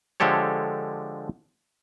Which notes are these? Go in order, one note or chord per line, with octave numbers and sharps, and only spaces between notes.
D3 F3 G#3 G4 A4 C#5